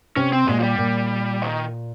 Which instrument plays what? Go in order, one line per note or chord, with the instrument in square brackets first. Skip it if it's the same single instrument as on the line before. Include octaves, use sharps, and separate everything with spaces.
[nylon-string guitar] C3 [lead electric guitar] C#4
[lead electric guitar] C4
[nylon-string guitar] A#2 [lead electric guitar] G#3
[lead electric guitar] F3
G3
[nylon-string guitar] A#2
[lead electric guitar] D#3